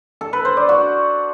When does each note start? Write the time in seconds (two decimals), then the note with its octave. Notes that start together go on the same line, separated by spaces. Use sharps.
0.21 A4
0.33 B4
0.45 C5
0.57 D5
0.69 F#4